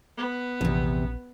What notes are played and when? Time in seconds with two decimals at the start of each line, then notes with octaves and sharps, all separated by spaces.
0.17 B3
0.61 A#1 E2 C3